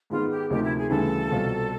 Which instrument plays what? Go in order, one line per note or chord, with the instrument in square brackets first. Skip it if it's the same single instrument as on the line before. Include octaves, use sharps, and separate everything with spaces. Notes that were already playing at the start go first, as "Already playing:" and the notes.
[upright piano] G#2 D#3 G#3 B3 [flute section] F4
[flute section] G4
[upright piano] D2 C3 F3 A#3 D#4 [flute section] G4
[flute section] E4
G#4
[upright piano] D2 C#3 E3 G3 [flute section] A4
[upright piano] C2 B2 G3 C4 F4